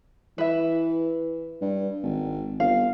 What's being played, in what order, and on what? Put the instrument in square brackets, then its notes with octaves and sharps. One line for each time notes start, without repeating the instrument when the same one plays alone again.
[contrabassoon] E3 [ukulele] B4 E5
[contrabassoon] G2
G#1
[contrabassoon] G1 [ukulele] F5